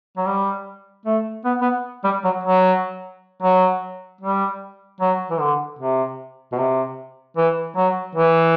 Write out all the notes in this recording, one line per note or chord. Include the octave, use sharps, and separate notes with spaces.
F#3
G3
A3
B3
B3
G3
F#3
F#3
F#3
G3
F#3
E3
D3
C3
B2
C3
E3
F#3
E3